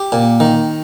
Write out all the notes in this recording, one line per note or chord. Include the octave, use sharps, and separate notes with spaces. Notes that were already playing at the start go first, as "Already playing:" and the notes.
Already playing: G4
A#2
D#3